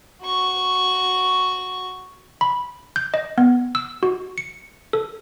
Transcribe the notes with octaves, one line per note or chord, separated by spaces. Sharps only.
F#4 C#6
B5
G6
D#5
B3
E6
F#4
C#7
A4